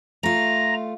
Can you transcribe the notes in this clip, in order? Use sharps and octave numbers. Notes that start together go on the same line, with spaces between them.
A3 F4 A#5